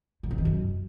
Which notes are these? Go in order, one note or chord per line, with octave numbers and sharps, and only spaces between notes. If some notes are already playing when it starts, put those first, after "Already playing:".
A#2
C3
D#3
F#2